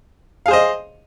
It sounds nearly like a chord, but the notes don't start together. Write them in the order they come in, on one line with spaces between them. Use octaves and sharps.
F5 G#4 C5 D#5